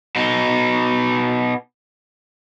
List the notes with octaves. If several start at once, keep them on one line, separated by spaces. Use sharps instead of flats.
B2 D#4